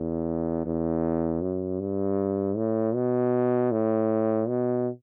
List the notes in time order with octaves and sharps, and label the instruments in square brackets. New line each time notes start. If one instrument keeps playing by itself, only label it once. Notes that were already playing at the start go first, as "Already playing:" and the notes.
Already playing: [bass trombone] E2
E2
F#2
G2
A2
B2
A2
B2